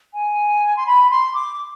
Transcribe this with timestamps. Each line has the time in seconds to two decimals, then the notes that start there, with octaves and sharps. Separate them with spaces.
0.14 G#5
0.76 C6
0.86 B5
1.10 C6
1.34 D6